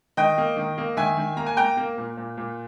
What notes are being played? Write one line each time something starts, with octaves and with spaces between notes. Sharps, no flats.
D#3 D#5 G5
A#3
D#3
A#3
D#3 E5 G#5
D#3
A#3 A#5
G#5
A#3 G5 A#5
A#3
A#2
A#2
A#2